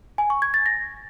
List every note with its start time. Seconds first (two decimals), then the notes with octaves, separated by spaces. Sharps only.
0.18 G#5
0.30 C#6
0.42 G#6
0.54 A6
0.66 A#6